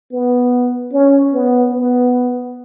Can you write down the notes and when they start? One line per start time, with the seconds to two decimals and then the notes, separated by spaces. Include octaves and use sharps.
0.12 B3
0.93 C#4
1.33 B3
1.74 B3